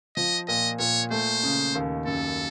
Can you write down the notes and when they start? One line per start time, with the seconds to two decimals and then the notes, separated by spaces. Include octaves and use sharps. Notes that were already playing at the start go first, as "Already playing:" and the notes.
0.17 F3 D#5
0.48 A#2 D#5
0.79 A#2 C#5
1.11 A3 C5
1.43 C#3
1.75 D#2
2.06 F#2 A4